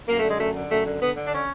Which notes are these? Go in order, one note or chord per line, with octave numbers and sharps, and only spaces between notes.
F#2 A#3
A3
D3
G#3
F#2 A3
D3
F#2 A3
D3
D3 B3
D3
D4
C#4